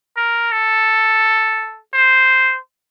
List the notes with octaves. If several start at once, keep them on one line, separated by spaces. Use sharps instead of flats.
A#4
A4
C5